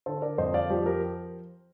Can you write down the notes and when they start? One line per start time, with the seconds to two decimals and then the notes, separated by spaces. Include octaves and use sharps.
0.06 D3 A4 C5
0.22 A#4 D5
0.38 F2 C5 D#5
0.54 D5 F5
0.70 F3 G4
0.86 G4 A#4